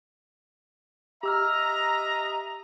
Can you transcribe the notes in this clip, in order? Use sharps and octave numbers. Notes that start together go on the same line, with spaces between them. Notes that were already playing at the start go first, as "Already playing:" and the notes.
G4 D#5 E5 A#5 E6 F6